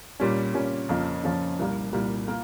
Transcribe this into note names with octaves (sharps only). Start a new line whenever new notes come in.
A#2 G3 C#4
A#2 G3 C#4
F2 C#3 F3 A#3 C#4
F2 C#3 F3 A#3 C#4
C2 A#2 G3 A#3
C2 A#2 G3 A#3
A#3 F4